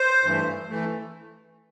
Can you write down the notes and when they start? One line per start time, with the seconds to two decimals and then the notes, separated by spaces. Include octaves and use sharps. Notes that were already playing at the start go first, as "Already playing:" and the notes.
Already playing: C5
0.24 G2 E3 A3
0.69 E3 A3